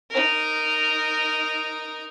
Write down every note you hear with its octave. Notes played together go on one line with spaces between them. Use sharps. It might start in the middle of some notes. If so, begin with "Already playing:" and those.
D#4 A#4